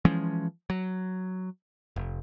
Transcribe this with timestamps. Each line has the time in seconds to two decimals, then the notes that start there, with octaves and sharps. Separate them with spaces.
0.05 E3 F3 G#3 C#4
0.70 F#3
1.96 F1